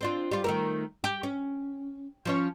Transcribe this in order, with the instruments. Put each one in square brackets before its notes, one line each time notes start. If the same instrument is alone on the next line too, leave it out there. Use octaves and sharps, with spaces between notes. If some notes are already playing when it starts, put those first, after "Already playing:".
[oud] C4 D4 F4
G3 F4
D#3 A3 A#4
G4
C#4
F3 C#4 C#5